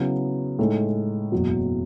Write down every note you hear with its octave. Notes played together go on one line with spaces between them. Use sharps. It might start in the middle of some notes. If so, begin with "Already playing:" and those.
Already playing: C#3 F#3 B3 E4 G#4
A2 G#3 D#4 A4
F#1 E2 B2 F#3